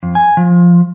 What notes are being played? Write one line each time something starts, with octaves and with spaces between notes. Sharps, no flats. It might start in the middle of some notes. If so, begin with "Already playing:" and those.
F2
G#5
F3